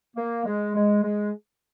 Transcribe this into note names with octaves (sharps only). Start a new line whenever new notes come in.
A#3
G#3
G#3
G#3